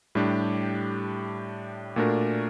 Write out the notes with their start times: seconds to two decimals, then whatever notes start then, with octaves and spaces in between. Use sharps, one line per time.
0.15 A2 G3 D4 G4
1.96 A#2 A3 D4 F#4 A#4